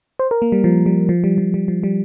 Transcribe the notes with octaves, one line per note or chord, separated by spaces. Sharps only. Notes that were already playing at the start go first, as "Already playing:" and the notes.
C5
A#4
A#3
G3
F3
G3
F3
G3
F3
G3
F3
G3